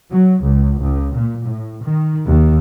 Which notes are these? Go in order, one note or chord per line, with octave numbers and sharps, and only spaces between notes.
F#3
C#2
C#2
A#2
A2
D#3
D#2